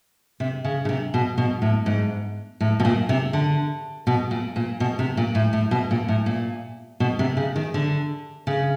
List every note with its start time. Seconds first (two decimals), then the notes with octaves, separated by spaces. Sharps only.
0.40 C3
0.64 C#3
0.85 C#3
0.89 C3
1.14 B2
1.38 B2
1.62 A2
1.86 G#2
2.61 A2
2.80 B2
2.85 A#2
3.09 C3
3.33 D3
4.07 B2
4.31 A#2
4.56 A#2
4.80 B2
4.99 C3
5.17 A#2
5.35 A2
5.53 A2
5.71 B2
5.91 A#2
6.08 A2
6.26 A#2
7.00 B2
7.19 C3
7.37 C#3
7.56 D#3
7.74 D3
8.47 C#3